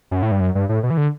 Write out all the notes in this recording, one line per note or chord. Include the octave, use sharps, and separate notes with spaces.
F#2
A2
G2
F#2
G2
A2
B2
E3
D3